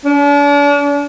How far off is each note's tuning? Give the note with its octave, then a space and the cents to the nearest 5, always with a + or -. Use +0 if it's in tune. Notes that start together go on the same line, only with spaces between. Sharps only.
D4 -40